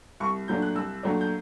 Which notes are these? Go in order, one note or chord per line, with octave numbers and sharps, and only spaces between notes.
C2 C#6
A#2 F#3 A3 D4 G6
F#6
C2 E6
A#2 F#3 A3 D4
G6